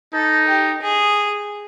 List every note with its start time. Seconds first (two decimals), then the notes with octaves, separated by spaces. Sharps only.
0.13 D#4 A4
0.48 G4
0.81 G#4